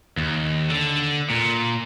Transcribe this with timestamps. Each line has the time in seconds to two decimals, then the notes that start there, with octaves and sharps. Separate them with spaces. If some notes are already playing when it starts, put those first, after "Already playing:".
0.17 D#2
0.70 D3
1.30 A#2